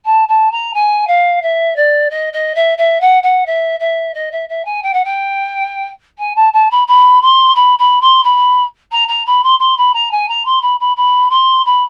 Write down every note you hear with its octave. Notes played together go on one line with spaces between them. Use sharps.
A5
A5
A#5
G#5
F5
E5
D5
D#5
D#5
E5
E5
F#5
F#5
E5
E5
D#5
E5
E5
G#5
G5
F#5
G5
G#5
A5
A5
B5
B5
C6
B5
B5
C6
B5
A#5
A#5
B5
C6
C6
B5
A#5
G#5
A#5
C6
B5
B5
B5
C6
B5